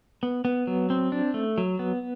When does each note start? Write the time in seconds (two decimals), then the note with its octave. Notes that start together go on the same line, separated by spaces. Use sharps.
0.23 B3
0.45 B3
0.67 F#3
0.90 C4
1.12 D4
1.34 A3
1.58 F#3
1.79 B3